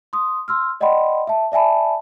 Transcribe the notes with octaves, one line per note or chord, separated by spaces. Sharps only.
C6 D#6
C6 E6 F6
D5 D#5 F#5 G5 B5 C6
E5 A5
D5 E5 G#5 A5 B5